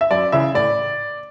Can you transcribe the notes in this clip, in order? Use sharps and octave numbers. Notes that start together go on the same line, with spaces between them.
E5
F#2 D5
C#3 E3 E5
A2 D5